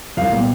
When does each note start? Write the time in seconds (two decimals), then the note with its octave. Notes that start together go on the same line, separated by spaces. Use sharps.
0.17 C2 F5
0.33 A#2 G3 B3